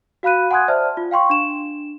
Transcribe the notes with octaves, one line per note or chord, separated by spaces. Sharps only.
F#4 F5 B5 F#6 D#7
F#5 G#5 C6 D#6 F#6 G#6
C5 D5 E5 A5 F6
F4
F5 G5 C6 C#6
D4 E7